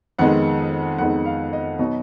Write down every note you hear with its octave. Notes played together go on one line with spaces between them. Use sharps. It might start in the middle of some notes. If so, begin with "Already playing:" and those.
F2 D#3 G#3 B3 D#4 F#5
F2 D#3 G#3 B3 D#4 F#5
F5
D#5
B2 F#3 B3 D#4